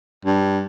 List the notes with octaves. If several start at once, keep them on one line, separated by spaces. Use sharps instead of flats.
G2